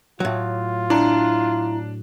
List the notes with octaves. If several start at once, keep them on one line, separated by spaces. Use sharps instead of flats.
A2 F#3 F4
D4 E4 A#5